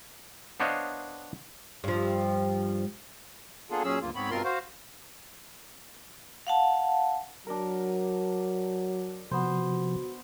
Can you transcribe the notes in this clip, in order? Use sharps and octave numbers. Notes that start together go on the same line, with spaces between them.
B3 D4 C5 C#5 D#5 F5
G2 F3
A#3 B3 D4 F4 G#4 A4
A#2 F#3 C#4 G#4 E6
D2 G2 A#3 F4
G#2 B3 C4 C#5 B5
G2 B2 C4 F4 A#4 C6
F#4 C5 F5
F5 F#5 A5
F#3 D4 A#4
C3 F3 B3 F#4 C5